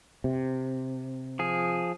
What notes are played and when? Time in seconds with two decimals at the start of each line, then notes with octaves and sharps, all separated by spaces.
0.24 C3
1.39 F3 G#4